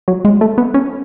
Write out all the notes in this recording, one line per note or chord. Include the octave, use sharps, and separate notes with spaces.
F#3
G#3
A3
B3
C#4